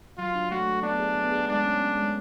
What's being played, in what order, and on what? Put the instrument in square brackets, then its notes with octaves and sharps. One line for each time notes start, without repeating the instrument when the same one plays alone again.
[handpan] F#3 [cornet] F4
[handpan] D4
[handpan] A3 [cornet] F#4
[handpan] A3
[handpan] B3 [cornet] D4
[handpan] G#4
B3
G#4
[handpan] G#3 [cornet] D4
[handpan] C#4
C#4
G#3